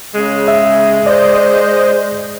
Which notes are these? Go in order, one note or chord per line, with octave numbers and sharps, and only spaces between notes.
C#3 G#3
E5
C5 D5 D#5